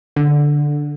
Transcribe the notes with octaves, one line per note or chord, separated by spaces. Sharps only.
D3